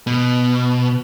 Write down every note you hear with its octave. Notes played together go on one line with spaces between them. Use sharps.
B2